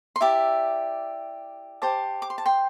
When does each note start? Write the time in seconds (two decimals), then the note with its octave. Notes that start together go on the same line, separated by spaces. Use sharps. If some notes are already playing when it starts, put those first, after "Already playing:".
0.16 C6
0.21 E4 G4 D5 E5 A5
1.82 G4 C5 A5 D6
2.22 D6
2.30 C6
2.38 A5
2.46 G5 C6